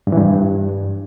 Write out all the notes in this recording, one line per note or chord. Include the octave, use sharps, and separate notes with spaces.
G2
E3
G2